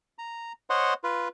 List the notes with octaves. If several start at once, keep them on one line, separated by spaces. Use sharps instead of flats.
A#5
C5 C#5 D#5 F#5 C6
F4 B4